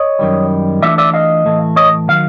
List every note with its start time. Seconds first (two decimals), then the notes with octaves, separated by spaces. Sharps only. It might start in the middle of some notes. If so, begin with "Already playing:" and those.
Already playing: C#5 D#5
0.19 F#2 D#3 G3
0.82 E3 A3 D4 F4 D5 E5
0.98 D5 E5
1.14 D#5 F5
1.45 A2 E3 A3
1.76 C#5 D#5
2.08 D#3 F#3 F5